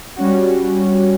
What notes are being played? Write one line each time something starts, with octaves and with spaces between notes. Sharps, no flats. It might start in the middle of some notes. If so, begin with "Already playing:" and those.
G3 C#4 F#4